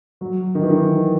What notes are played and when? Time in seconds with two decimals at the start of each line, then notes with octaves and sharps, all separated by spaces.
0.21 F#3
0.55 D#3
0.63 E3
0.70 D#3